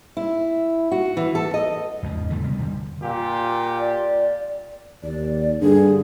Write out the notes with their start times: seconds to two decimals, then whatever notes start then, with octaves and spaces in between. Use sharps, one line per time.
0.17 E4
0.92 F#4
1.17 E3
1.35 A4
1.54 D#5
2.03 E2 G#2 C#3 F3
2.30 D3 E3 G3 A3
2.42 C3 G3 B3
2.58 F2 D3 G3
3.02 A#2 F4 G4
3.80 D5
5.03 D#2 D5
5.61 G2 D3 G#4